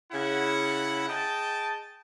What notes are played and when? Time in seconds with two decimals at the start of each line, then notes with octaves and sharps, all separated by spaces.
0.12 C#3 E4 F#5
1.09 G#4 D#5 G5 A5